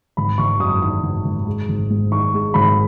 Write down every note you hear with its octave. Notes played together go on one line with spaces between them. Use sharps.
G#1 B5
G#1 C#6
F#2 D#6
D#3 D#6
G#1
G#1
G#3
G#1
G#2
D#3 C#6
G#3
G#1 B5